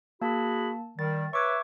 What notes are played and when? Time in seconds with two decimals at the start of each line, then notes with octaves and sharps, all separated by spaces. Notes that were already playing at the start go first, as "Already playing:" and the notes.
0.21 A#3 F#4 G#4 A5 B5
0.99 D#3 G3 A6
1.33 B4 C#5 E5 C#6 D6 G#6